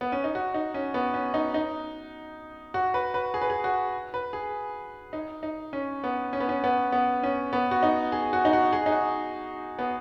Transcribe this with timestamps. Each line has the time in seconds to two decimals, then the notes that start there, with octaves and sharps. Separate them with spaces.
0.01 B3
0.12 C#4
0.24 D#4
0.35 F#4
0.54 D#4
0.74 C#4
0.94 B3
1.14 C#4
1.34 D#4
1.54 D#4
2.74 F#4
2.94 B4
3.14 B4
3.34 G#4
3.41 B4
3.50 G#4
3.64 F#4
4.14 B4
4.33 G#4
5.13 D#4
5.43 D#4
5.73 C#4
6.04 B3
6.33 C#4
6.40 B3
6.49 C#4
6.64 B3
6.92 B3
7.23 C#4
7.53 B3
7.71 F#4
7.83 D#4
8.12 G#4
8.33 F#4
8.45 D#4
8.53 F#4
8.73 G#4
8.86 D#4
8.92 F#4
9.79 B3